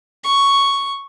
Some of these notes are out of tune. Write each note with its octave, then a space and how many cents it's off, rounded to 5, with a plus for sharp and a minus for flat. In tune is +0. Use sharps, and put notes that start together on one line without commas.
C#6 +0